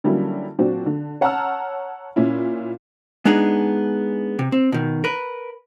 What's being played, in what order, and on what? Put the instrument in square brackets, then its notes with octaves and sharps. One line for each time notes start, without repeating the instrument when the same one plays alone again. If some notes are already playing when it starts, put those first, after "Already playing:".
[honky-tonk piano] D3 F#3 G3 A#3 C#4 E4
A#2 F#3 C4 D4 F#4
D3
C#5 F#5 A5 A#5 E6 F6
A#2 C#4 E4
[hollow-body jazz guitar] G#3 B3 D4 D#4 G#4
C3
C4
B2 D#3
A#4 B4